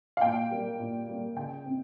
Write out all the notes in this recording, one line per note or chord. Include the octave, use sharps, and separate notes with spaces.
F5
A#2 G5
G3 A#3
A#2
G3 A#3
C#3 G5
C4